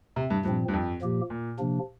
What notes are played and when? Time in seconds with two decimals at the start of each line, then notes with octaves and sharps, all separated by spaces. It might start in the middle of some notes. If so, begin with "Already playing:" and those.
0.16 C3
0.30 G2
0.44 G2 A#2 F3 C4
0.68 G2
0.73 F2
1.02 A#2 F3 A#3 G4
1.30 A#2
1.59 C3 F3 A#3 D4